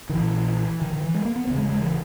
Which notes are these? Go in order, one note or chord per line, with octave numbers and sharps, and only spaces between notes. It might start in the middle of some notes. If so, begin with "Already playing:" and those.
D#3
A#1 A#2 E3
D#3
D#3
E3
G#3
A#3
B3
E1 D#2 C#3 B3
G#3
G#3
E3